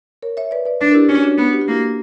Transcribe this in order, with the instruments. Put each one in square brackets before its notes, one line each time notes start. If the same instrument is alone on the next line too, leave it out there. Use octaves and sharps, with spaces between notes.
[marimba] A#4 C#5
C#5 E5
B4 D5
B4 D5
[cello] D4 [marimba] B4 D5
[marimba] A#4
E4 G4
[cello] C#4 [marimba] D4 F#4
[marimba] D4 F#4
[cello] B3 [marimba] D4 F#4
[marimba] G4
F#4
[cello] A#3 [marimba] E4 G4